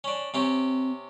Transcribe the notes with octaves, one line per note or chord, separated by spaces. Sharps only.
C#4 D4
C3 C4 C#4 G4